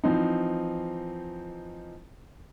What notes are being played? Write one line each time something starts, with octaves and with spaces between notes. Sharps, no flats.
E3 F3 C4 D#4